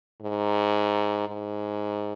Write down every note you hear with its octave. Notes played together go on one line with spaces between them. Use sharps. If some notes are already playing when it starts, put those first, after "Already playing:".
G#2
G#2